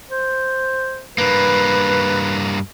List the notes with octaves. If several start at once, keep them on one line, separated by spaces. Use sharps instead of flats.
C5
G2 A#3 B4